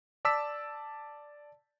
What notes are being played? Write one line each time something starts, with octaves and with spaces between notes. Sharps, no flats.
D5 A5 D6 E6 B6